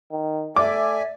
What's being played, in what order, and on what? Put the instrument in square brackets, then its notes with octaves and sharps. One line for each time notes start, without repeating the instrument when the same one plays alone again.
[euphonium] D#3
[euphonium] A3 [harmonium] D5 G#5 [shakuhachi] E5 [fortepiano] D6